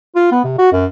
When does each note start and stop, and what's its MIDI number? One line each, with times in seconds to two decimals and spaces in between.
0.16 0.29 65
0.31 0.40 59
0.44 0.56 48
0.58 0.69 66
0.72 0.86 42